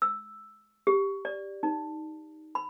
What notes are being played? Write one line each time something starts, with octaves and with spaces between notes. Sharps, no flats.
E6
G4
D5
D#4
B5